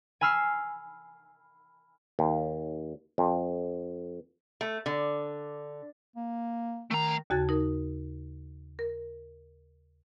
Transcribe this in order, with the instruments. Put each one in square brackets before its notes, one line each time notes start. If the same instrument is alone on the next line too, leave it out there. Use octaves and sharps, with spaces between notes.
[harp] G#5 B5 E6 F6 C7
[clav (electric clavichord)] D#2
F2
[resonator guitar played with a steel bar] A3
D3
[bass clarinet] A#3
[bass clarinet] D#3 [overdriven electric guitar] A3 A#5
[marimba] D#2 C#3 F#4 A5 G#6 A6
D#4 A#4
A#4